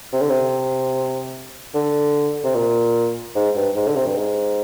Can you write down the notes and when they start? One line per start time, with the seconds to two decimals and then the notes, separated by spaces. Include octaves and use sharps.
0.13 C3
0.21 D3
0.31 C3
1.74 D3
2.44 C3
2.54 A#2
3.35 G#2
3.55 G2
3.76 G#2
3.87 D3
3.96 C3
4.06 G2
4.16 G#2